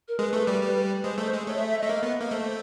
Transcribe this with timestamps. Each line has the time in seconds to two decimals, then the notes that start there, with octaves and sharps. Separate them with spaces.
0.08 A#4
0.19 G#3 B4
0.33 A3
0.47 G3
0.62 G3
1.03 G#3 C5
1.18 A3
1.32 G#3
1.46 A3 C#5
1.57 E5
1.68 E5
1.79 A3 D#5
1.89 A#3
2.03 B3
2.20 A#3
2.31 A3 C5